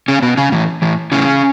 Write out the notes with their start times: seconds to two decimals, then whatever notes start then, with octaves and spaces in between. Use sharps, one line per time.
0.08 C#3 C#4
0.22 B2 B3
0.37 C#3 C#4
0.52 A2 E3
0.82 A2 E3
1.12 A2 C#3 E3 C#4